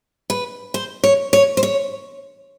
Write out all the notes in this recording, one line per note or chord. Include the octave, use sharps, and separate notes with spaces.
B4
C5
C#5
C#5
C5
C#5